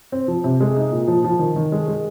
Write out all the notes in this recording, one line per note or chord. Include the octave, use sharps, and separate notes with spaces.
C4
F3
C3
G#3
D#4
A#2
F3
F3
D#3
D#3
G#3
G#3